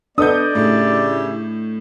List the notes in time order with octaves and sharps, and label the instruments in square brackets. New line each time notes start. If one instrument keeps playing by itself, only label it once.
[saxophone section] B3 [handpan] D4 A4 D#5 [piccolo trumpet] D5 [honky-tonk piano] D#6 G6
[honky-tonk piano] A2 [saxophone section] C#3 E4 G4